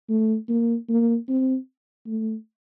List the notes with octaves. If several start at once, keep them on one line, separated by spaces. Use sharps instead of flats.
A3
A#3
A#3
C4
A3